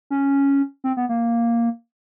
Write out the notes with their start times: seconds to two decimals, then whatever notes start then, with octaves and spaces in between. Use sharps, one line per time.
0.10 C#4
0.84 C4
0.97 B3
1.09 A#3